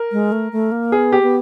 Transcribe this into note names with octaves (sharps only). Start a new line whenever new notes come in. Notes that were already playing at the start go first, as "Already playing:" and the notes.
Already playing: A#4
G#3
A3
A3
A#3
B3 G#4
G4
B3